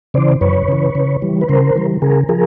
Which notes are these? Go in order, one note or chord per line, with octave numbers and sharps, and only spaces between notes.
C#3 E3 C5 D5
F#2 B4 C#5
C#3 E3
C#3
E3 G3
B4
C#3 A#4 C5
E3 G3
C#3 G#4 A#4
F3 G#4 A#4